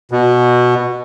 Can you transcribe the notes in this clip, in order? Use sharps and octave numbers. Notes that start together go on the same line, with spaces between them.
B2